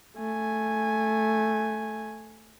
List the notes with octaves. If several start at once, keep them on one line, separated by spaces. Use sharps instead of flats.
A3 G#5